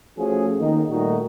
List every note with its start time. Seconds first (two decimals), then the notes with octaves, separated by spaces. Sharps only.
0.18 F3 A3 C#4 F#4 G#4
0.60 D#3 A#3 D#4
0.90 A#2 D#3 G3 A3 D#4 F#4